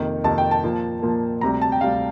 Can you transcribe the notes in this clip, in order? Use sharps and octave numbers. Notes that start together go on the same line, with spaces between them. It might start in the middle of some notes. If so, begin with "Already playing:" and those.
Already playing: F2 C3 D#3 A#3
F2 C3 D#3 A#3 A5
G5
A5
A#2 F3 A#3
A#2 F3 A#3
D2 C3 G3 A#5
A5
G5
D2 C3 G3 F5